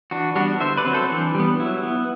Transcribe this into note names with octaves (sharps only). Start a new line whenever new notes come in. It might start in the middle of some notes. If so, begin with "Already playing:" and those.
E3 D4 F#4
G3 B3 D4 F#4
D3 C5 E5
B4 D5
F#3 C4
A4 C5
E3 D4
G3 B3
F#3 E4
B3